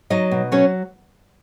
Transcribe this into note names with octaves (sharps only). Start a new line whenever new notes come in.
F#3 D#4 D#5
B2
F#3 C#4 C#5